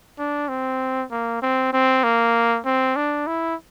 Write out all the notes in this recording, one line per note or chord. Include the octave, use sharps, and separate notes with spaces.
D4
C4
A#3
C4
C4
A#3
C4
D4
E4